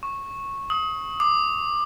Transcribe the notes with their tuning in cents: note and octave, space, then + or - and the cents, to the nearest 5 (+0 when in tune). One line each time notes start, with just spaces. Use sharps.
C#6 -10
D#6 +25
D6 +25